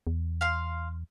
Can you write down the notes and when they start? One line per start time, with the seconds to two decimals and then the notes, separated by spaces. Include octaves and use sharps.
0.07 E2
0.41 F5 C6